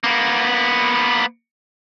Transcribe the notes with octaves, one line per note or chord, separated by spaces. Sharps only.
A#3 B3